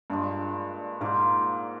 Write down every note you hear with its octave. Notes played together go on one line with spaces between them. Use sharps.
G2 A#2 G#3 D4
G#2 A#3 F4 C5